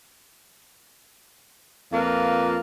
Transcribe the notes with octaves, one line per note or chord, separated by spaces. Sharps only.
F2 A#3 F4 B4